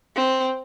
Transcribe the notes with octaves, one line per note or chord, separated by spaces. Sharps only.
C4